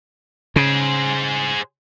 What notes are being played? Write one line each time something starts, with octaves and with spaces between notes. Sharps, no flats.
C#3 G#4 C5